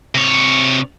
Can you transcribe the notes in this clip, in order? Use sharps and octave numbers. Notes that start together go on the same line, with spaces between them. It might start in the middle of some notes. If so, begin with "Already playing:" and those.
C3 C#5